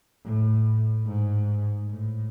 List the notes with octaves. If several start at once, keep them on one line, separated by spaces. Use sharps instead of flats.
A2
G#2
A2